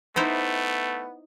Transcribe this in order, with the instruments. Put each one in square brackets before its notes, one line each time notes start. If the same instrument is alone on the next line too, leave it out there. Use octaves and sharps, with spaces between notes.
[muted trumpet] A3 [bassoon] B3 [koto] D#4 E4 C5